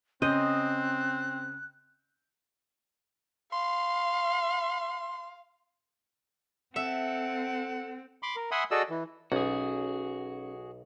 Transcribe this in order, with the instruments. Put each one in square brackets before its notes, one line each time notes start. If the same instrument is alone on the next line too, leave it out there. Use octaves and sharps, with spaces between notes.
[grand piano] C#3 C6 G6 [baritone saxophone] C4 [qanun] D#5 [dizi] F#6
[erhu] F5 [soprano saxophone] C6
[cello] C4 [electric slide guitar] A4 [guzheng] E5 [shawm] F#5
[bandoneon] B5 C6 D6
A#4
E5 F#5 G#5 B5 C6 D#6
F#4 G#4 A4 D5 D#5 E6
E3
[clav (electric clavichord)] B1 [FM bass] C#4 [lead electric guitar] F#4 G#4